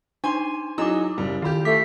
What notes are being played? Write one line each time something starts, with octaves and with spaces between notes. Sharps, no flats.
D4 D#4 G#5 C6
F#3 D#4 E4 G#4 D6 E6
F#1 G3
D#3 F4 G4 B5 G6
A3 D6 B6 C7